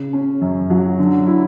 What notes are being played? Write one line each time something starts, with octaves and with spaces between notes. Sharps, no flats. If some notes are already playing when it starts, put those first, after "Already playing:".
Already playing: C#3
C#4
F#2
F#3
D3
E4